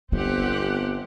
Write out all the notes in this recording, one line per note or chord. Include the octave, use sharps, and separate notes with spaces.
G1 B3 C4 G4 F#5